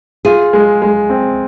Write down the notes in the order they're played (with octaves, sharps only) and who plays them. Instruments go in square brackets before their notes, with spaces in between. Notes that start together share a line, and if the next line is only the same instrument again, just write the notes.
[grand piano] F4 [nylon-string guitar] G#4
[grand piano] G#3
G#3
C4